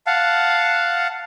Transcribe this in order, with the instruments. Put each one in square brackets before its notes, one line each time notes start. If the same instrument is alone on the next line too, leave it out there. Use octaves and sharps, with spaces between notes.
[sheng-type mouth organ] F5 F#5 A5